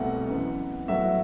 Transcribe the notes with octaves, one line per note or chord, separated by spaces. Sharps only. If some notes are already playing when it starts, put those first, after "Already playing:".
Already playing: C2 B2 A3 C4 F#5
F#2 E3 B3
A2 F#3 B3 E5